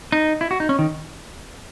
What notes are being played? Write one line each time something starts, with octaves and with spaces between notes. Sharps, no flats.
D#4
E4
F#4
D#4
C#4
D#3